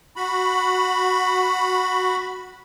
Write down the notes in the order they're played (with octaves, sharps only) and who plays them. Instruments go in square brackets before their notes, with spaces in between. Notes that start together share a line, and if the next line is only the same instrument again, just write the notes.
[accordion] F#4 B5